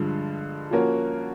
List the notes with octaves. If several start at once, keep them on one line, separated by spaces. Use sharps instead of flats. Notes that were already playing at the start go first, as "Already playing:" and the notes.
Already playing: G2 D3 F3 G#3
F3 A#3 C#4 F#4 A#4